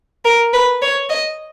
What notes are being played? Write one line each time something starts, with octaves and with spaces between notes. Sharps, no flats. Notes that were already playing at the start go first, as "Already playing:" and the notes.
A#4
B4
C#5
D#5